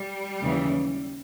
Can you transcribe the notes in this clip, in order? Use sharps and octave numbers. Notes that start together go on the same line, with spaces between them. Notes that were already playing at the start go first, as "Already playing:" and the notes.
Already playing: G3
D#2 C#3 E3